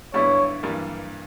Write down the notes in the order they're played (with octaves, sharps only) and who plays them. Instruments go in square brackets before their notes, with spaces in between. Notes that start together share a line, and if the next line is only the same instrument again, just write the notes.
[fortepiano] G2 D3 G3 B3 E4 [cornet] C#5
[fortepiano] G2 E3 G3 A#3